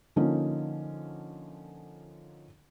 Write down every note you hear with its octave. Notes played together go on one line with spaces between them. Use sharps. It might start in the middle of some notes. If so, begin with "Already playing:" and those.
D3 F3 A#3 C#4 D#4